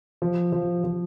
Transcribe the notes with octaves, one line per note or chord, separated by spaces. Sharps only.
F3
F3
F3